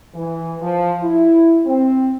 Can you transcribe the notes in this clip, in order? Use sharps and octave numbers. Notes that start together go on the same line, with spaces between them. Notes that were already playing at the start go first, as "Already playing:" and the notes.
E3
F3
E4
C4